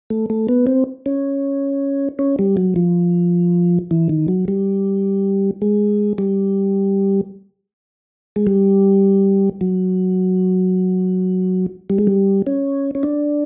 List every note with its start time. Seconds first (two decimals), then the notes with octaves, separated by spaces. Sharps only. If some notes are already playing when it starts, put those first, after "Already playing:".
0.10 A3
0.30 A3
0.49 B3
0.67 C4
1.06 C#4
2.19 C#4
2.39 G3
2.57 F#3
2.76 F3
3.91 E3
4.09 D#3
4.28 F#3
4.48 G3
5.62 G#3
6.18 G3
8.36 G#3
8.47 G3
9.61 F#3
11.90 G3
11.98 G#3
12.07 G3
12.47 C#4
12.95 C#4
13.03 D4